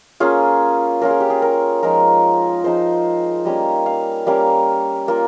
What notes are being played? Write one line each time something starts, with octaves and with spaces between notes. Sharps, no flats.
A#3 C#4 F4 G#4
A#3 C#4 F4 A#4
G#4
G4
G#4
A#4
F3 G#3 D#4 A#4
F3 G#3 D#4 C5
G3 A#3 C#4 D#5
F5
G3 A#3 C#4 F5
A#3 F4